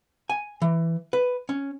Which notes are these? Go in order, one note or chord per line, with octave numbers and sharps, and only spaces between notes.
G#5
E3
B4
C#4